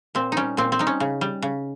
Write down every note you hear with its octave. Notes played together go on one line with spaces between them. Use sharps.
A#2 C4
G3 C#4 D#4
A#2 C4
C4
G3 D#4
C#4
C#3
G3
C#3